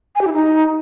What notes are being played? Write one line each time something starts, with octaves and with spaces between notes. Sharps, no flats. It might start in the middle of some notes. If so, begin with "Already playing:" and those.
G#5
G4
E4
D#4